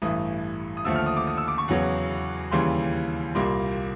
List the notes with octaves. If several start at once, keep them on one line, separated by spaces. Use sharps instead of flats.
A1 G2 E3 A3 D#6
D#6
D#2 D3 F3 A3 E6
F6
D#6
D6
D#6
E6
D6
C#6
E2 C#3 F#3 B3
D#2 C#3 E3 G3 C6
C2 A#2 G3 A#3 C6